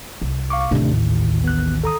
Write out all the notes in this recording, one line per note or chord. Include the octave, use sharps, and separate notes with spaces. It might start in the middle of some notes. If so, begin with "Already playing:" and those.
C2
F5 C#6 D6
A1 D#2 C3 A3 D4
A2
B3 F#6
A4 A#5 D#6